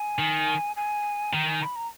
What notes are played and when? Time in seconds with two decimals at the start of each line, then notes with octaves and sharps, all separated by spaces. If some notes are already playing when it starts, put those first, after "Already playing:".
Already playing: G#5
0.19 D#3
0.76 G#5
1.33 D#3 G5
1.48 G#5
1.62 B5
1.76 A#5